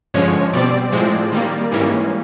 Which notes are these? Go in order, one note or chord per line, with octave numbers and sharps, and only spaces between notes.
G2 D3 F3 G#3 C#4 C#5
B2 G3 C4 D5
A2 F3 G#3 C4
D#3 G3 A#3
G#2 E3 G3 A#3 C#4